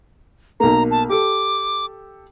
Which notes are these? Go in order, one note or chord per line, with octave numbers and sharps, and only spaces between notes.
B1 A#3 A#5
A5
G4 A4 D6